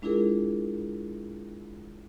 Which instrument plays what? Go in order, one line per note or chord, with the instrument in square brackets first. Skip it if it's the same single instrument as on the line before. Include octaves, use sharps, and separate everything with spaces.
[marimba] G#3 D4 E4 F4 G#4 A#4